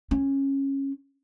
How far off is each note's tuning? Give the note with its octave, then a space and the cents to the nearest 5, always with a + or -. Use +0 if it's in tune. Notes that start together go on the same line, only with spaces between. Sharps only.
C#4 -15